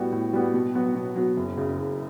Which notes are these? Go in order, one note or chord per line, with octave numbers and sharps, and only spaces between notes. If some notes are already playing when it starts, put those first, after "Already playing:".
Already playing: A2 G3 B3 F#4
A2
G3 B3 F#4
B2
F#3 B3 F#4
B2
F#3 B3 F#4
F#1
F#2 C#3
F#1